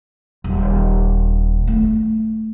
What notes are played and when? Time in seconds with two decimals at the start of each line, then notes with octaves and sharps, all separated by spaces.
0.44 D#1
1.67 A3